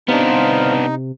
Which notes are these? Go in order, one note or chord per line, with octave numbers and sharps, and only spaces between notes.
C3 B3 D4 D#4 C5 F5